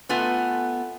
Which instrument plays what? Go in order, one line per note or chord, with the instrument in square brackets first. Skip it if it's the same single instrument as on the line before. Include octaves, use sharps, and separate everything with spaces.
[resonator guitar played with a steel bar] A3 B3 F4 G#5